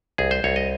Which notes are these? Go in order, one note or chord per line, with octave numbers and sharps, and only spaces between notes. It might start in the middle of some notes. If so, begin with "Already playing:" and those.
C2 G#4
C5
C2 C#5
D#5